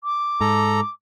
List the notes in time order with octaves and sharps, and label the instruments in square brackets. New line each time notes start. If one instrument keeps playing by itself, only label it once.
[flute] D6
[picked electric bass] G#2 [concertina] A4 A#5